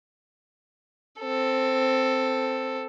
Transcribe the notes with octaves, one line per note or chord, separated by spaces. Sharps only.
C4 A4